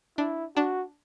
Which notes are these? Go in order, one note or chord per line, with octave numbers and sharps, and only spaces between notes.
D4 E4
D4 F#4